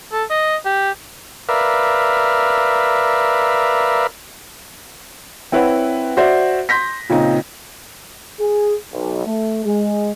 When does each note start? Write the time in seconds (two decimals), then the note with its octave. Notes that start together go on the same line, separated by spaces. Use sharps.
0.12 A4
0.30 D#5
0.65 G4
1.49 A#4 B4 D5 E5 F5
5.52 C4 E4 B4 C#5 F#5
6.17 F#4 C5 D5 E5
6.69 C6 G6 A#6 B6
7.09 A#2 C#3 C4 D#4
8.40 G#4
8.92 B1
9.26 A3
9.65 G#3